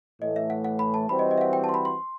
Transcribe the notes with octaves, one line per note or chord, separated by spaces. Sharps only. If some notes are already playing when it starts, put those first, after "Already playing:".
A2 E3 A3 D#5
E5
F#5
F#5
B5
A5
E3 G3 C4 F#4 C5 B5
D#5
D#5
E5
F#5
G5
A5
C6
B5
C6